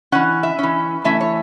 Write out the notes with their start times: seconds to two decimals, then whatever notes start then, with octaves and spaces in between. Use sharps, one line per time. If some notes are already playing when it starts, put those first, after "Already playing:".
0.12 E3 C#4 F#5
0.43 E5
0.59 E3 C#4
1.04 E3 A3 C#4 E5
1.21 C#5